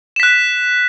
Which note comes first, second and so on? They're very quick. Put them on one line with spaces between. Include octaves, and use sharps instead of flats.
E7 B6 F#6